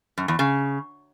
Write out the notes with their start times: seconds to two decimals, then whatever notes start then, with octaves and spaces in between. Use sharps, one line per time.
0.18 F#2
0.28 E2
0.39 C#3